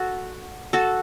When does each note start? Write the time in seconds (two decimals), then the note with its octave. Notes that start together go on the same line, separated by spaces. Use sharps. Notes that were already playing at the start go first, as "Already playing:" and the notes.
Already playing: F#4 A4
0.73 F#4 A4